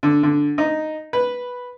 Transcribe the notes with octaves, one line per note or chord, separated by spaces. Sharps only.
D3
D3
D#4
B4